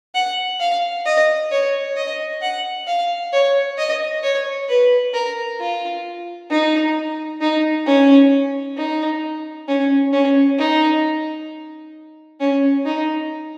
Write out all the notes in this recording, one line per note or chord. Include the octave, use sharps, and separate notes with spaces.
F#5
F5
D#5
C#5
D#5
F#5
F5
C#5
D#5
C#5
B4
A#4
F4
D#4
D#4
C#4
D#4
C#4
C#4
D#4
C#4
D#4